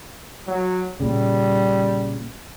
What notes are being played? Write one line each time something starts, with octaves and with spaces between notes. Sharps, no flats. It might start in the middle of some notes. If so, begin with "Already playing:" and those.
F#3
A#2 C#3 G3